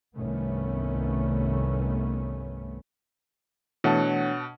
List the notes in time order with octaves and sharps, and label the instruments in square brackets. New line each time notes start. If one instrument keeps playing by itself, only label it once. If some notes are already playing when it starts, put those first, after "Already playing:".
[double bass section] C2 G2 D#3 A3 B3 C#4
[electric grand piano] B2 F#5 A5 [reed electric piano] E3 A3 [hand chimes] D4 C#5 C#7